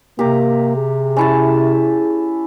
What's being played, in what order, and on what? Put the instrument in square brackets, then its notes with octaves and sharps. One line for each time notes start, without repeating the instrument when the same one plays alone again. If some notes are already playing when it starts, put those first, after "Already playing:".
[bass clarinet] C3 [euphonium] A#3 [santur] G4 A#5
[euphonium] G#4
[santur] C#4 E4 A5